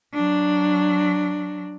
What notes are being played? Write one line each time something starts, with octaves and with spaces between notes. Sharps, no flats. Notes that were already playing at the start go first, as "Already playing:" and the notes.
F#3 D4